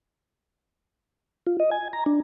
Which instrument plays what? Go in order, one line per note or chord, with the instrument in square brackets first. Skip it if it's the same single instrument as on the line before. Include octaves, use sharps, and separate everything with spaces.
[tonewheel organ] F4
D#5
G#5
A#5
D4